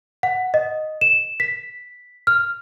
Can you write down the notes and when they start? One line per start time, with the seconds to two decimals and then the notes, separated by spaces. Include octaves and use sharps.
0.23 F#5
0.54 D#5
1.01 E7
1.40 B6
2.27 F6